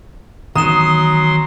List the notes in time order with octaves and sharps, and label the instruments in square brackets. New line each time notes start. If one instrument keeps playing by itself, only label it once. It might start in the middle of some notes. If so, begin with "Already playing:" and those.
[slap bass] D#3 E3 B3 [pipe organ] F#3 C6 [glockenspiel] A#5 E7 [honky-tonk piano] D#6